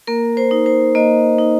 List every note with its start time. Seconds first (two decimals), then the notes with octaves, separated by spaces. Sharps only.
0.07 A#3 A#4
0.37 C5
0.51 D#4
0.66 C5
0.95 A#3 D#5
1.38 D#4